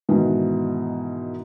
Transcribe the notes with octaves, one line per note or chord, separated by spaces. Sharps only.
G#2 B2 D#3 E3